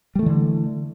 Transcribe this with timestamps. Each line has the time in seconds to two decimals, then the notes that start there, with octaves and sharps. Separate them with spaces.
0.15 G3
0.19 A3
0.23 E3
0.26 D3